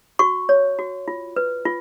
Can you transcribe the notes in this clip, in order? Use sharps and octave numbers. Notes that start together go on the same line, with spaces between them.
F#4 C#6
C#5
F#4
F4
B4
F4